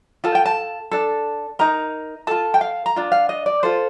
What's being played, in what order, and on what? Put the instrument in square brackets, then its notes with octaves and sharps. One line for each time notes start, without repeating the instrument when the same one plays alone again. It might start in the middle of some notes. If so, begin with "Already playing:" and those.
[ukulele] F4 A4 A5
G5
A5
D4 A4
D#4 A#4 A#5
F4 A4 A5
G5
F5
A#5
D4 F4
F5
D#5
D5
F4 A4 C5